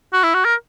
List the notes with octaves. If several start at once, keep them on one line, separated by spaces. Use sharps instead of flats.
F#4
E4
F#4
A#4